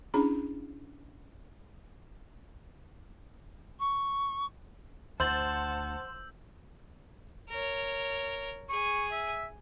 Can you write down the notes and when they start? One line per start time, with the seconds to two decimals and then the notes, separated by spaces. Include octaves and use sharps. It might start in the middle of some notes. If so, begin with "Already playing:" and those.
0.14 C#4 D4 E4 G#4 A#5 B5
3.79 C#6
5.20 D2 C5 F#5 A5 E6 G6 A6 F#7
7.49 A#4 C#5
8.69 G#4 G#5 C#6
9.12 E5